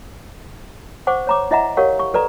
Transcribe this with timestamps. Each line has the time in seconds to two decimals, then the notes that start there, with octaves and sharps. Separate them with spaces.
1.07 C5 F#5 C#6 D6
1.27 C#5 A#5 D6
1.51 E4 D#5 E5 F#5 A#5
1.77 G4 A#4 C#5 F5 F#5 C#6
1.99 C#6
2.14 A4 B4 D5 A#5